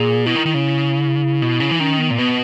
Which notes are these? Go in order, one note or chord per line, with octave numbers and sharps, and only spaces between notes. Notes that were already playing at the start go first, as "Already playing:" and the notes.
Already playing: A#2 G#4
B2 E4
D#3
D#3
C#3
B2
C#3
E3
D#3 C#4
B3
A#2
B2 B3